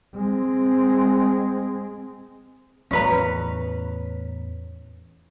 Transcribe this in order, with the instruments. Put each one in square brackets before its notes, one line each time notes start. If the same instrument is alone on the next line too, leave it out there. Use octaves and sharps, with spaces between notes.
[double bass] G#3 C4
[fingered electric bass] E2 A2 [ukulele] C#4 B4 A#5